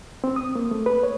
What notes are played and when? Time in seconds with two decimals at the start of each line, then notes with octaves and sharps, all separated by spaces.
0.24 C4
0.36 D#6
0.55 A#3
0.71 A3
0.86 B4
1.03 C#5